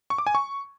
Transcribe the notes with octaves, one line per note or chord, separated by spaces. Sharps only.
C#6
D6
G#5
C#6